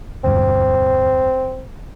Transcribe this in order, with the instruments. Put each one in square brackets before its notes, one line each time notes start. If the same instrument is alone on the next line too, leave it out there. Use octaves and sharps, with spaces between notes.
[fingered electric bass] E1 D2 G2 [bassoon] C4